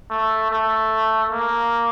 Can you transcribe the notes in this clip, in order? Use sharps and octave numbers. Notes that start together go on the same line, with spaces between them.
A3
A3
A#3